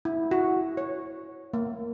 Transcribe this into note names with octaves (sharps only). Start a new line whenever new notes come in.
E4
F#4
C#5
A#3